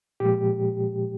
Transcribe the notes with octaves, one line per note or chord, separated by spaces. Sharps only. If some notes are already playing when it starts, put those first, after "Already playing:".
A#2 F3 G#3 G4